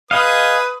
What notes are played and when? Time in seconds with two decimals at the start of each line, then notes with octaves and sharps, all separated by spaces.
0.11 G#4 B4 D#5 F5 D#6